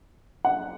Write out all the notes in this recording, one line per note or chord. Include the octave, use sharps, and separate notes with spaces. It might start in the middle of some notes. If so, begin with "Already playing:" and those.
F#5